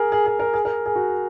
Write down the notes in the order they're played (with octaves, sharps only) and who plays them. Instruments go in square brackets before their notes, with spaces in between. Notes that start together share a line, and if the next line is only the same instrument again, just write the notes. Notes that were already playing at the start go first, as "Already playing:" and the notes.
Already playing: [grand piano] G#4 A#4
G#4
G#4
A#4
G#4
A#4
G#4
F#4